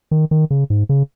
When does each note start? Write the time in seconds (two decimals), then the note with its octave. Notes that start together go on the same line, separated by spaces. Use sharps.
0.11 D#3
0.31 D#3
0.51 C#3
0.70 G#2
0.89 C#3